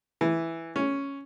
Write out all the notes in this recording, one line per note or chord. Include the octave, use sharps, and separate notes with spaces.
E3
C#4